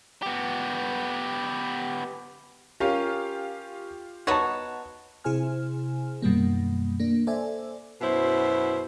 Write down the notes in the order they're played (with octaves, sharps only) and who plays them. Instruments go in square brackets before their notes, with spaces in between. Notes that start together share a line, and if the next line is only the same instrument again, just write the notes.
[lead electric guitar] B3 G4
[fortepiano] C#4 A#4 [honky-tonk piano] F4 G4 F5
[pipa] B3 D#4 F#4 [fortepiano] C#5 A5
[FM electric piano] C3 E4 G#4 C5 G#5 F6
F#2 B2 D#3 G3 A#3
A#3 D4
A4 C5 D5 E5 G#5
[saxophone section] F#2 B2 E4 C5